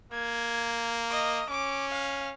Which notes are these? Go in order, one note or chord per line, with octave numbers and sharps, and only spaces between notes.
A#3 G#6
D#5
C#4 D6
F5